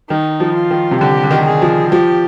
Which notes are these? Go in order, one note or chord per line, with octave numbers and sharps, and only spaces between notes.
D#3 D#4
F3
F4
D#3
C3
D3 G4
D3
D#3
G#4
F3
F3 G4